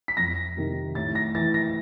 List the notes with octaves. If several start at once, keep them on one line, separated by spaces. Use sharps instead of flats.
B6
F2 A#6
C3 D#3
A2 A6
A#6
E3 A6
A#6